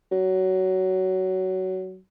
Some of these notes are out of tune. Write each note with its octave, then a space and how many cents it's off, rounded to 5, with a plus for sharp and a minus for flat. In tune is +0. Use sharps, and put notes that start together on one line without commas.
F#3 +15